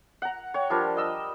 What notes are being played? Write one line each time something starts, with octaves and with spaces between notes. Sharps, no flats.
F#5 A#5
C#5 G5
F3 G3 D4 A#4
D#5 E6